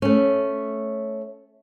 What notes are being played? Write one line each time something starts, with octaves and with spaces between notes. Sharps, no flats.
A3 C#4